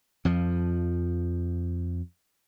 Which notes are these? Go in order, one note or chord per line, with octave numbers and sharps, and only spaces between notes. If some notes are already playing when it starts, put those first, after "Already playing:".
F2 F3